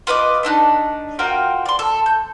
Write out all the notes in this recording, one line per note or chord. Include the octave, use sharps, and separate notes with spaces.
F4 B4 D#5 D6
A3 D4 D#4 F#6
F4 F#4 A#4 G5
D5 C6
A4
G6